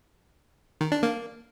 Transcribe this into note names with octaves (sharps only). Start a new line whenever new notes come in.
D#3
D4
A#3